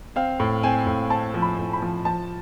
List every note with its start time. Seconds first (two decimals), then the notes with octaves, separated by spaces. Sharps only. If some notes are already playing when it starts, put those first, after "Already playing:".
0.16 C4 F5
0.40 A2
0.63 C4 G#5
0.86 A2
1.10 C4 A5
1.34 F3
1.42 B5
1.59 A2
1.73 B5
1.82 F3
2.05 F3 A5